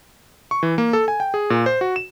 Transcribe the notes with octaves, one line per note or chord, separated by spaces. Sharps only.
C#6
E3
A#3
A4
G#5
G5
G#4
A#2
C5
F#4
E7